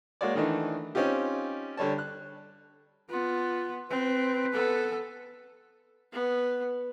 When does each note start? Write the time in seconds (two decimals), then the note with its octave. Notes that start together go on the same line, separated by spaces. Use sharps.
0.21 G#3 A#3 F#4 C#5 D5
0.35 D#3 E3 A3 D4 D#4
0.95 C4 C#4 D#4 F4 G4
1.77 D3 G3 C#5 A5
1.98 F#6
3.10 B3 F4
3.90 C4 B4
4.53 B3 A4
6.12 B3